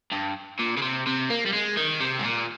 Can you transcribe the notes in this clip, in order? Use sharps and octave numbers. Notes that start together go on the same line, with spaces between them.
G2
A#2
C#3
C3
C3
A#3
G3
G#3
D#3
C3
G#2
A#2